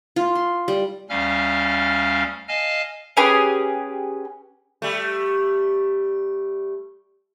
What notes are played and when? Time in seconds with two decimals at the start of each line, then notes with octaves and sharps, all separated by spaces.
0.16 F4
0.35 C6
0.68 G3
1.09 D2 G3 C#4 F5 F6
2.48 D#5 F5 G#5 A5 F6
3.17 C#4 G4 G#4 B4
4.82 G3 A3